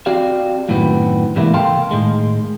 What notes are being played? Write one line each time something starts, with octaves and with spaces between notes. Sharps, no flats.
C4 F#4 G4 D5 F5
F#2 A2 D3 D#3 B3 C4
G#2 C3 E3 A#3 E4
C#2 A4 F5 G5 A5 C6
A2 D#3 G#3